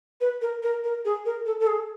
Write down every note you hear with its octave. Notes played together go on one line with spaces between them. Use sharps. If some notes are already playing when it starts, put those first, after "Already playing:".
B4
A#4
A#4
A#4
G#4
A#4
A4
A4
G#4